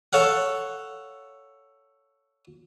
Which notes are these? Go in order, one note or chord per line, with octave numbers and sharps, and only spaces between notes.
A4 C#5 F5 F#5